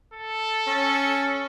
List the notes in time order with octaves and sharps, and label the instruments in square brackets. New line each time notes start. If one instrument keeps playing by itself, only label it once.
[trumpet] A4
[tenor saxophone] C#4